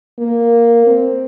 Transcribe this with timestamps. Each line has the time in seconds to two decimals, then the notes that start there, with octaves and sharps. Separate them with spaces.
0.19 A#3
0.86 C4